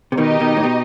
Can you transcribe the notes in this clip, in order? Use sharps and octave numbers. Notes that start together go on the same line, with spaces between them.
C3
B2 D#3 D#4 G4 D#5
B2 D#3
A2
B2